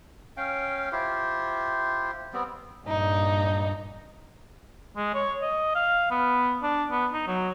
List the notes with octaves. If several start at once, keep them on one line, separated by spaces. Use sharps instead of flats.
C#4 F5 G5
E4 F4 G4 C5
G3 B3 C4
G2 A#2 D#4
G#3
C#5
D#5
F5
B3
D4
B3
D#4
F#3